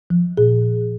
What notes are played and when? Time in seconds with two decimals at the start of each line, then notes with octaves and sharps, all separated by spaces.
0.10 F3
0.37 A#2 G#4